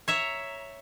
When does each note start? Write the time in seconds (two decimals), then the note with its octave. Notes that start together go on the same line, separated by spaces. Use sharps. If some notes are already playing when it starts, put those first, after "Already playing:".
0.08 C#5 E5 A#5